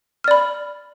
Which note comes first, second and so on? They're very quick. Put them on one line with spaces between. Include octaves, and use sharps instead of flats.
F6 D5 B5